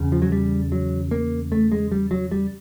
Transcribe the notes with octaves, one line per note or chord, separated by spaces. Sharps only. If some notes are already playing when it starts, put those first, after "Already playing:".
Already playing: E2 C#3
F3
F#3
G3
F#3
A#3
A3
G#3
G3
F#3
G3